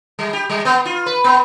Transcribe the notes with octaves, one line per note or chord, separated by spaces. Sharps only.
G3
G4
G3
B3
F4
B4
B3